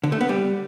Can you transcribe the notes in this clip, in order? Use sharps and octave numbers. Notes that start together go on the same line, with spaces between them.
D3
A3
B3
G3